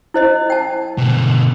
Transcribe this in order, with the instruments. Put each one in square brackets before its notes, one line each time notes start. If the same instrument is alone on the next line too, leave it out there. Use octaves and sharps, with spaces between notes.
[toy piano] E4 C5 D#5
G5 A5
[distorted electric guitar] B2 D3